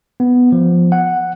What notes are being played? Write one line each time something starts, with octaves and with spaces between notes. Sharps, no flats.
B3
F3
F#5